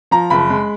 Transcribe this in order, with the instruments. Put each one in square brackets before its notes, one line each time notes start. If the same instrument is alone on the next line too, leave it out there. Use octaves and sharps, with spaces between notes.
[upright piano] F3 A#5
F#1 B5
G#3